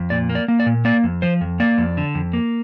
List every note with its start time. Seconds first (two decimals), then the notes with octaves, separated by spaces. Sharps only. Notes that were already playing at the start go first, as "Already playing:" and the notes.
Already playing: F2
0.10 A#2 D5
0.29 A#3
0.35 D5
0.48 A#3
0.60 D5
0.66 A#2
0.85 A#3 D5
1.03 F2
1.22 F3 C5
1.41 F2
1.60 A#3 D5
1.78 F2
1.97 D3
2.15 F2
2.33 A#3